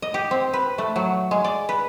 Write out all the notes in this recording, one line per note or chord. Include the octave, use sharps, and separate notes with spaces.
D#5
G4
C4
B4
A3
F#3
G#3
D5
B4